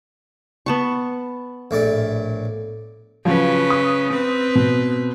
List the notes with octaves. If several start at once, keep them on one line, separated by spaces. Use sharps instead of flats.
B3 A5 C#6
A#1 A2 D5
C#3 F3 F#3 B4
D#6
C4 B4
B2